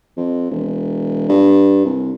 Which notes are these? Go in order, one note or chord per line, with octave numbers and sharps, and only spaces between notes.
F2
E1
G2
C2